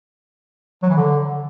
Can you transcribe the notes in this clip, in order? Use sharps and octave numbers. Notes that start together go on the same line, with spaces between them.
F#3
E3
D3